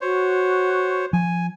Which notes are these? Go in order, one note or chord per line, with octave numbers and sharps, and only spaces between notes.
F#4 C5 C#5
F3 G#5